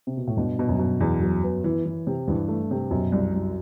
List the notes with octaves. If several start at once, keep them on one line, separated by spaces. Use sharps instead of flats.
C3
B2
A2
G2 B2
B2
F#2
B2
E2
F#3
B3
E3
E3
C3
G2 E3
A3
C3
F#2 B2
C2
C2